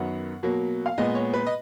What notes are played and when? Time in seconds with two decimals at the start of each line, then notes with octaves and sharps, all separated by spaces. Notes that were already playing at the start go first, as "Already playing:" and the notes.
Already playing: F#2 D#3 F#3 B3 F#5
0.43 B2 F#3 A#3
0.86 F5
0.98 A#2 G#3 B3 D#5
1.15 C#5
1.34 B4
1.47 D#5